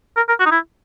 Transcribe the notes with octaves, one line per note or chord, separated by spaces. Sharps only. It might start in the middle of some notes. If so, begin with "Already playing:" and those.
A#4
A#4
F#4
D#4
E4